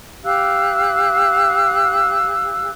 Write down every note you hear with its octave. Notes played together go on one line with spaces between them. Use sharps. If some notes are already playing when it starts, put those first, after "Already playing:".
G4 F5 E6 F#6